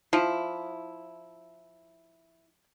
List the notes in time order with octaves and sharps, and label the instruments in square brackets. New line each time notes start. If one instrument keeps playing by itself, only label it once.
[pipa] F3 [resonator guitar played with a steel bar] E4